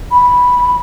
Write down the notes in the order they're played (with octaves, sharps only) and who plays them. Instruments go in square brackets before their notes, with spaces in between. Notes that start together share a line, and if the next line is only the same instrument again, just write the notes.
[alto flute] B5